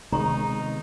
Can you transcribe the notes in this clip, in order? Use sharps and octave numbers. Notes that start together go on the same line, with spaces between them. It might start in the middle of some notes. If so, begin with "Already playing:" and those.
C3 D#3 G#3 B3 D#4 A#5 C#6